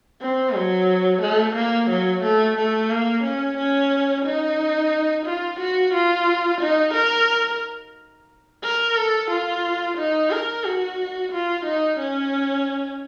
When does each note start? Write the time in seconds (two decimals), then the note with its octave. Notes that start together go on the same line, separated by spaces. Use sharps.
0.21 C4
0.55 F#3
1.21 A3
1.56 A#3
1.90 F#3
2.23 A3
2.57 A3
2.90 A#3
3.24 C#4
3.57 C#4
4.25 D#4
5.26 F4
5.60 F#4
5.94 F4
6.61 D#4
6.94 A#4
8.63 A#4
8.97 A4
9.31 F4
9.98 D#4
10.31 A#4
10.64 F#4
11.32 F4
11.66 D#4
12.00 C#4